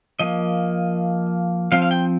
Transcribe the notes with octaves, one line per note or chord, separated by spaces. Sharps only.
F3 A#3 D#5
F3 C4 F5
F5
G5